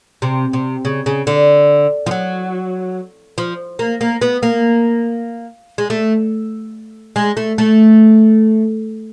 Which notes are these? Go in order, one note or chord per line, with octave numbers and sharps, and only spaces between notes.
C3
C3
C#3
C#3
D3
F3
F#3
F3
A#3
A#3
B3
A#3
G#3
A3
G#3
A3
A3